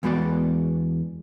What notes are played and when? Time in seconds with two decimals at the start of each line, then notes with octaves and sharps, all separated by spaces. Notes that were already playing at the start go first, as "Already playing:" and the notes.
0.03 E2 G#3 B3 F#4 D5